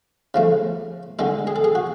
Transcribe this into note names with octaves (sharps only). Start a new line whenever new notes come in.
C#3 F3 A3
D3 G#3 A4
G#4
A4
G#4
F#4